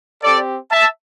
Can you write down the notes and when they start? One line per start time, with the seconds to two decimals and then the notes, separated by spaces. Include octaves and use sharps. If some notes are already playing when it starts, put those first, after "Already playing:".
0.23 C4 G4 A4 D5
0.71 E5 A5